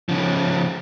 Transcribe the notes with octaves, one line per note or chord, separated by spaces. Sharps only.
C#3 F3